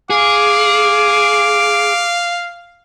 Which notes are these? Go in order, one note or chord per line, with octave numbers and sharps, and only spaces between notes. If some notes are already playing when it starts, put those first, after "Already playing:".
G#4 F5 D6